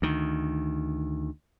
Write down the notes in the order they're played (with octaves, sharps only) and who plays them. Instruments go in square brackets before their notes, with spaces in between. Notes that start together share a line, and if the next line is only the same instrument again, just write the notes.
[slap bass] D2 D#3